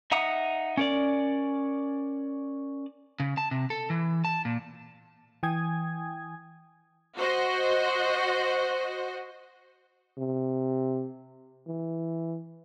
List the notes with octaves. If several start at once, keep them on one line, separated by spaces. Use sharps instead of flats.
D#4 E5 F#5 A#5 D#6
C#4 A#4 D5
C#3
A5
C3
A4
E3
A5
A#2
E3 G5 G#5 D#6 G#6
F#4 C5 D#5
C3
E3